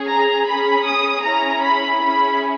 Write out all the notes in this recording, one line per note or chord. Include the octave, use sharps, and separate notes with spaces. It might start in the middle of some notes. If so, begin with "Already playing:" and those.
Already playing: C#4 G#4
A#5
C#4 G#4 B5
D#6
C#4 E4 G#4 A#5
B5
C#4 E4 G#4 B5